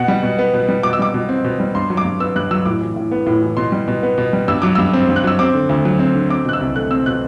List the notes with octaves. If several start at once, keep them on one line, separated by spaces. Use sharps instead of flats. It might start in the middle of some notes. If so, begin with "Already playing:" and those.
Already playing: B2 F#5
G3
B2
B3
B2
G3
B2 D6
E6
G3 D6
B2
C4
B2
G3
G2 C6
F#3
D6
G2
B3 E6
G2 F#6
F#3 E6
A2 D6
E3
A2
B3
A2
E3
B2 C6
G3
B2
B3
B2
G3
G2 E6
F#3 D6
G2 E6
C4
G2
F#6
F#3 E6
C4 D6
D3
D2
F#3
C4
D3
C4 D6
B2 F#6
E6
C2
A3 F#6
C4 E6
B2 F#6